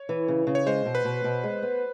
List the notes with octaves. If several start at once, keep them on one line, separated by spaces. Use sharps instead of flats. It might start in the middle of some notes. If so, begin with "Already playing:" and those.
Already playing: C#5
E3
C#3
C#3
C#5
G#3 C5
B2
B4
B2
B2
G#3
B3